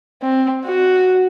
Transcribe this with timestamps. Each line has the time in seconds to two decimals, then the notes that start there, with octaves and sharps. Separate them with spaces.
0.22 C4
0.65 F#4